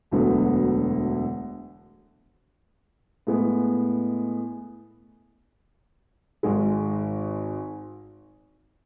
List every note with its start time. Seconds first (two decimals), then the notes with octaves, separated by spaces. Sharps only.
0.11 E1 D2 D3 F#3 B3
3.27 A2 G#3 B3
6.43 G#1 G#2 G#3